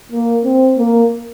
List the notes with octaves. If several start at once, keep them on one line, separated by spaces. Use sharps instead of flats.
A#3
C4
A#3